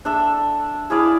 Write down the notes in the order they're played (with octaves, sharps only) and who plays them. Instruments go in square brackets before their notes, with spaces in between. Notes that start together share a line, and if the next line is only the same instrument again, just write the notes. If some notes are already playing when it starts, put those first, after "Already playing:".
[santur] D4 A4 E5
E4 G#4 D5 F5